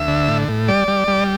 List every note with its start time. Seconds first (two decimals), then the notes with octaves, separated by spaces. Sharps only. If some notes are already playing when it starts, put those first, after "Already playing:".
Already playing: D2 E5
0.08 D3
0.28 A2
0.48 A2
0.68 G3 D5
0.88 G3
1.08 G3